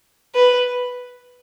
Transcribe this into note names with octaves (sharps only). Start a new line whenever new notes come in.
B4